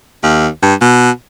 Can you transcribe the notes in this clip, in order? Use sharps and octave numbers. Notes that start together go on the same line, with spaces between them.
D#2
G2
B2